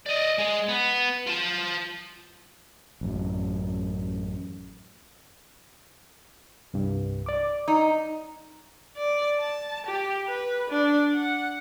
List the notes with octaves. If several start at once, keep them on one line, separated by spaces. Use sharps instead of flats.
D5 D#5
G#3 G#4
B3
F4 A5
A1 F#2
C2 G2
D5 D6
D#4
D5
A5
G4
B4
D4
F#5